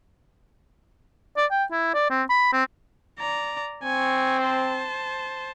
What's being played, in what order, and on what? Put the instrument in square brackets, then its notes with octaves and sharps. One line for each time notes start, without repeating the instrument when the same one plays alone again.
[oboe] D5
G5
E4
D5
C4
B5
C4
[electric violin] D5 A#5
[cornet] C4 [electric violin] G#5 C#6
[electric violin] C5 A5